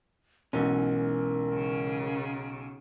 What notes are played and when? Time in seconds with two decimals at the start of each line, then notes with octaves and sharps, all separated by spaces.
0.53 B1 G#2 E3 C#4 A#4
1.52 C#3